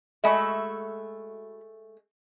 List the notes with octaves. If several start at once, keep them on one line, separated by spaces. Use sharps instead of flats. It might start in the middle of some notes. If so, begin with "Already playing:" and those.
G#3 A3 F#4 E5 B5 C#6